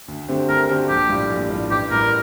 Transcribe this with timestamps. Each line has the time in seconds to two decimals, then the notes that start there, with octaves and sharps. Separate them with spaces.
0.08 D2
0.29 D3 A3 C4 G4
0.49 D2 A#4
0.69 D3 A3 C4 G4
0.89 A#1 G4
1.09 A2 G3 D4 F4
1.30 A#1
1.50 A2 G3 D4 F4
1.71 A1 G4
1.91 A2 G3 A#4